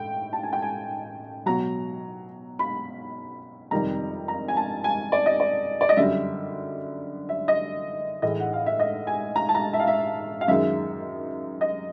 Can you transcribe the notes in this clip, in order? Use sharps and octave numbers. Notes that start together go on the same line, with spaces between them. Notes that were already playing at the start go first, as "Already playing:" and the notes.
Already playing: A2 G5
A5
G#5
G5
G#5
B2 F#3 A#5
B5
F2 C3 D#3 G3 A#5
A#5
G#5
A5
G#5
D5
D#5
D5
D5
D#5
F#2 D3 G3 E5
E5
D#5
A2 E3 G#3 D#5
F#5
F5
E5
D#5
G#5
A#5
A5
A#5
E5
F5
E5
F5
F#2 D#3 G#3 E5
D#5